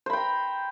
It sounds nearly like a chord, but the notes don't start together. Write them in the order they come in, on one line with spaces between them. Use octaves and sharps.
C5 B5 G5 A#5